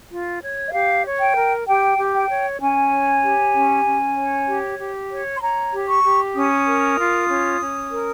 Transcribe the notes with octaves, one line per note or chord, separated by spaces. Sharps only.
F4
C#5
D#5
G4 F5
C#5
G5
A#4
G4 G5
G4
G5
C#5
C#4 G#5
C#5
G4
C#4
C#4
C#5
G4
G4
C#5
C6
C#5 A#5
G4
C#6
G4
C#4 D#6
A#4
F4
C#4
C#4
A#4